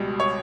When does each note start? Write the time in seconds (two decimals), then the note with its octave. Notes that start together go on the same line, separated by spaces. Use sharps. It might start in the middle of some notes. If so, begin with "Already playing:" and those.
Already playing: C#2 B2 G3
0.20 C#5